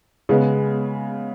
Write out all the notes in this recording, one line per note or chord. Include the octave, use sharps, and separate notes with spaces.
C#3 G#3 B3